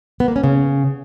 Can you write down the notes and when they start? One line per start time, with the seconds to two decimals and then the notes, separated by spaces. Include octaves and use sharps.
0.20 B3
0.28 A#3
0.36 C#4
0.44 C#3